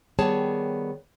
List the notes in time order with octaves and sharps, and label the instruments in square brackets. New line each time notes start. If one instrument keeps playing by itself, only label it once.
[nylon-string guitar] D#3 G3 B3 G#4 C#5 A5